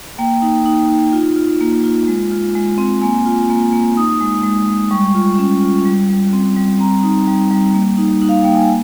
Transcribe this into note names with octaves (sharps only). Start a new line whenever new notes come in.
A#3 G5
D#4
D#4
D#4
F4
F4
A#3
F4
G#3
F4
G#3
C4
A#3 G#5
F4
A#3
A#3
D#4 D#6
G#3
G#3
G#3
G3 C#6
F4
C#4
F4
G3
G3
C4
G3
C4 A#5
D#4
G3
G3
A#3
D#4
D#4
F5
A#3 G5
G#5